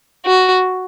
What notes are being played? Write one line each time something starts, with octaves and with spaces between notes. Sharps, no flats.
F#4